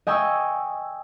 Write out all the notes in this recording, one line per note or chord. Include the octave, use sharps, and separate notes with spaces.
D#5 G5 G#5 C#6 E6